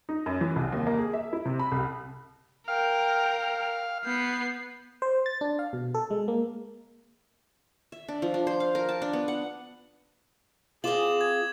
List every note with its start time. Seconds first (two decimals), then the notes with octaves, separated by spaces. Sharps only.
0.09 D#4
0.26 F#2
0.41 E3
0.56 C2
0.73 D#2
0.87 A#3
0.99 G#4
1.13 E5
1.33 E4
1.45 C3
1.59 B5
1.72 C2
2.68 A#4 F5 G5
4.05 B3 G6 C7
5.02 C5
5.26 A6
5.41 D4
5.59 F5
5.73 B2
5.94 A4
6.10 G#3
6.28 A#3
7.92 E5
8.08 D4
8.22 F3
8.34 D4
8.47 C5
8.60 F5
8.75 A#4
8.89 A5
9.02 D4
9.13 B3
9.28 F#5
10.84 C4 F4 G#4 D6 E7 F#7
11.21 G#6